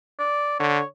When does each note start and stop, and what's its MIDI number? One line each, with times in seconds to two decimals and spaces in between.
0.19 0.56 74
0.60 0.81 50
0.60 0.85 73